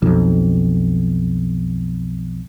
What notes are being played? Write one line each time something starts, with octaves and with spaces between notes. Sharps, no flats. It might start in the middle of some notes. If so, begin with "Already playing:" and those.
B1 F2